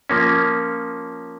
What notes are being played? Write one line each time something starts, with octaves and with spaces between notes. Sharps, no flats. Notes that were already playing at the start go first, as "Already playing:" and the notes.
F3 A#3 C#4